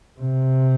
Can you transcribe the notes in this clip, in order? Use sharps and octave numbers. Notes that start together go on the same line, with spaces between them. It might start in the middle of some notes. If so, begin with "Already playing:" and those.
C3